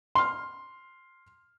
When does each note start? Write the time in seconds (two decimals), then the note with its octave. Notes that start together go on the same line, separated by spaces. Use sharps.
0.15 C6 F6